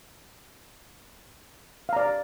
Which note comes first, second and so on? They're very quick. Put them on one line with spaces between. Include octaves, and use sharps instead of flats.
F5 A#5 D5